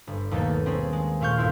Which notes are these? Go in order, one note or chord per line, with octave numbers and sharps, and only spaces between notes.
G1
D#2 B2 D#3 A3 A#3 A4
C4 C#4 G#4 A4
G#3
A#2 A3 F5 C#6 G6
G1 A3 E4 C6